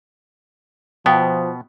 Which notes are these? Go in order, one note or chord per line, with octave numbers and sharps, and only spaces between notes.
B2 F3 B3 G5 A5